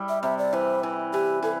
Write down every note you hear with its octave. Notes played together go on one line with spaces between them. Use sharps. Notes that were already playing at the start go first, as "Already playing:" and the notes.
Already playing: G3 E4
E5
C3 E5
D5
E3 C5
E3
E3 G4
E3 A4